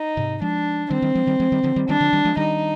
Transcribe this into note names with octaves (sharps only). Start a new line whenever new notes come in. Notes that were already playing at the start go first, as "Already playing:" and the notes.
Already playing: D#4
G#2 C3
F3 G#3 D4
D#3 G3 C4
D#3 G3
F3 G#3
D#3 G3
F3 G#3
D#3 G3
D3 F3
D#3 G3
D#3 G3 D4
D3 F3
D#3 G3
F3 G#3
D#3 G3 D#4